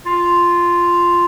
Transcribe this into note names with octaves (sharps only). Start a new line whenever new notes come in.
F4